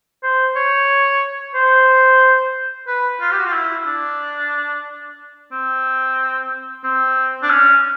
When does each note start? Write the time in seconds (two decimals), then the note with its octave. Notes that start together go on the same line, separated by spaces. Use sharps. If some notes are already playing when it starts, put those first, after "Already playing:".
0.23 C5
0.56 C#5
1.55 C5
2.88 B4
3.21 F4
3.32 G4
3.39 F#4
3.46 F4
3.53 E4
3.87 D4
5.52 C4
6.84 C4
7.43 D4
7.50 C#4